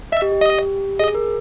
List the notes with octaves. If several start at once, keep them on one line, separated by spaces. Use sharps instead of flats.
D#5 E5
G4
G4
D#5
G#4 D#5
A#4